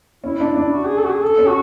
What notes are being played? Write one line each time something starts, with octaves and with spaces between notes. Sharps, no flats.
C#4 E4
D4
D4
F#4
G#4
A4
F#4
G#4
A4
C#4
F#4